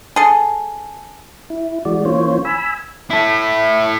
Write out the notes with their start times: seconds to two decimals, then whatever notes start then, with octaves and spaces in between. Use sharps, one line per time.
0.16 G#4 A4
1.50 E4
1.85 E3 G#3 F#4 D5
2.05 E3 A#3 C#4 F4 C5 C#5
2.45 G#5 B5 E6
3.10 E4 A4